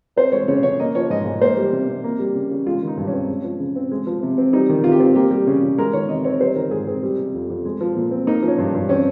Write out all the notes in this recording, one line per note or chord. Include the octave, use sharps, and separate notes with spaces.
C4 C5
G#3 C#5
C#3 C#5
C#3 C#5
A#3 D#5
F3 C#5
G#2 D#5
G#2
A#3 C5
G3
C3
C3
A#3
G3
C#3
C#3
G#3 F4
D#3
D#4
G2
C#4
C4
G#3
F3
C#3
C4
G#3
F3
C3
C4
G3 D#4
D#3
C3 F4
G4
C4 F4
A#3 G4
G3
C#3
C#3
G#3 A#4
D#3 C#5
C3 D#5
C4 C#5
G3 C5
D#3 A#4
G#2 G#4
C4 G#4
G3
C3
F2
F2
G#3
F3
A#2
C4
A#3 D#4
F3
C#4
G2
G2
C4 C#4